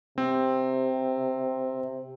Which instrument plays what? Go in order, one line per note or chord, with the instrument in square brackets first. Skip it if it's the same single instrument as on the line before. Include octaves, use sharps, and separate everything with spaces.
[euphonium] C3 [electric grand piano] C4